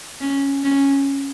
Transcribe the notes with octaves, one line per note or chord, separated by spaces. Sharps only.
C#4
C#4